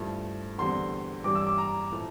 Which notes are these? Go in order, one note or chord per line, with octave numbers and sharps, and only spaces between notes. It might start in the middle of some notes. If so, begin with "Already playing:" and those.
Already playing: G2 F3 A3 E4
E2 D3 G3 C4 C6
G2 E3 G3 D6
E6
D6
A#5
A2 F3 A3 E4